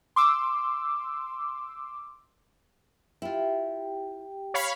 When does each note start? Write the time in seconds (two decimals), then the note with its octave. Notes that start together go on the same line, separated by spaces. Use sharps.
0.16 C6 D6 E6
3.22 E4 F4 G4 G5
4.54 C#5 F5 B5